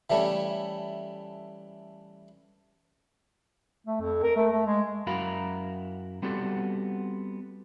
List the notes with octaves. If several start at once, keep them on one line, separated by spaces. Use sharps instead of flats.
E3 G3 A3 C#4
A3
F2
A#4
A3
A3
G#3
F#2 E4 F#4 A#4 F5 B5
G3 B3 C4 F#4 G4 A4